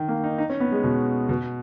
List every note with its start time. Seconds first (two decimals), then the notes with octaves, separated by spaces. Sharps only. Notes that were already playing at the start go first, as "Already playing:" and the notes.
Already playing: D#3
0.08 A#3
0.24 D#4
0.38 D#4
0.50 C#4
0.60 B3
0.72 G#3
0.84 B2
1.29 B2